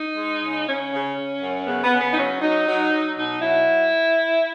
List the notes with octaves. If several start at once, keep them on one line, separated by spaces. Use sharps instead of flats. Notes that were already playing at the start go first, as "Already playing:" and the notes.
Already playing: D#4
G#3
C#3
C#3 C#4
C#3
C#3
F#2
C#3 B3
B3
C#3
B3
D#4
F#3 C#4
F#3 D#4
F#3
F#3
B2 D#4
F#3 E4